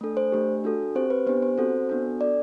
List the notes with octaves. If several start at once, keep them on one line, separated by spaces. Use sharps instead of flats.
A3 D4 A4
C5
A3 D4 G4
D4 F#4 A4
C4 G4 C5
B4
B3 D4 G4 C5
C5
C4 F#4 A4 C5
B3 D4 F#4 A4
D4 A4 D5